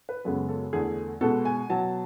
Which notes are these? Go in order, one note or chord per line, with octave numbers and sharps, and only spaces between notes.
B4
F#2 C#3 G#3 B3 A4
A4
E2 D3 A3 G#4
B2 G#3 B3 A4
G#5
B2 F#3 B3 A5